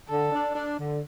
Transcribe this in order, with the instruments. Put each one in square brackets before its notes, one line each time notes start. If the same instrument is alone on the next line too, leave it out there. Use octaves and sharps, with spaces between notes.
[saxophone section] D3 [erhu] A4
[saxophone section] D4
D4
D3